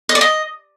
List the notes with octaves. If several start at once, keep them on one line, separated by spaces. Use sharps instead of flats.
D#5
D5
D#5